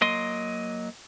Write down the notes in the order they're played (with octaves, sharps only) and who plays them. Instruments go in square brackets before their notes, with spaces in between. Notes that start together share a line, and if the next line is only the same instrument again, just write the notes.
[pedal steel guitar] F#3 A#3 D#5 C6